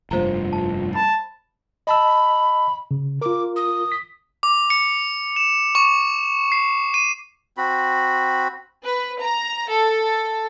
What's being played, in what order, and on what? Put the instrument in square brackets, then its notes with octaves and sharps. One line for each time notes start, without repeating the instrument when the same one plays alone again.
[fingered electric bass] F1 G2 A#3 [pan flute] F4 [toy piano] C5 F5 A#5
[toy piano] A5
[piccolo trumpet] A5 [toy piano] B5
[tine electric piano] D#5 A5 E6 [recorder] B5
[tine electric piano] C#3
[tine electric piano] F4 A#4 [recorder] D6
[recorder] D#6
[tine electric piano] B6
[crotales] D6
C#7
E7
C#6
C7
D#7
[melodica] C4 F#4 B5
[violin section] B4
A#5
A4